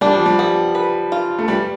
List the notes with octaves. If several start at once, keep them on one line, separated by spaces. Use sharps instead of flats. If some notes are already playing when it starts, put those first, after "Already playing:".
G3 D4
F3
G3
B3
B4
F4
A3
G3 B4